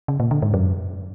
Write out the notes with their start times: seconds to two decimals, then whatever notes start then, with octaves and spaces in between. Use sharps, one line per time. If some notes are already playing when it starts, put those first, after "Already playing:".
0.08 C#3
0.20 A#2
0.31 D3
0.42 G#2
0.54 F#2